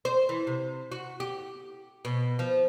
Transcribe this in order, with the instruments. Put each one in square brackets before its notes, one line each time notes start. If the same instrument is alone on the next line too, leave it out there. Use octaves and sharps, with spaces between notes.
[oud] C5
E3
C3
F#4
G4
B2
F3